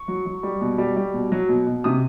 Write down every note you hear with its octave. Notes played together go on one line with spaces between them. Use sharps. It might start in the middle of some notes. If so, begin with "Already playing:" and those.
Already playing: C#6
F#3
F#3
G3
B2
G3
G3
B2
F#3
B2
B2
C3 D#6